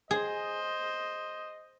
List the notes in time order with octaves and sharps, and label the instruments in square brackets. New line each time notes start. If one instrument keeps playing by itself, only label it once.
[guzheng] G#4 [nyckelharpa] C5 [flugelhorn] D#5